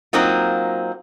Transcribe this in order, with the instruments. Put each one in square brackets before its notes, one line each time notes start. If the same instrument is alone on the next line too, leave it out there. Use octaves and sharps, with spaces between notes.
[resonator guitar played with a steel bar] F#3 A#3 C4 D#4 F4